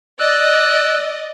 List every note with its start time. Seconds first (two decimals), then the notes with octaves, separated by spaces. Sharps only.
0.20 D5 D#5 E6 F#6